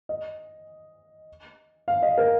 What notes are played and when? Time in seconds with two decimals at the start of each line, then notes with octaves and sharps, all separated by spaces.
0.09 D#5
1.88 F5
2.02 D#5
2.18 A#4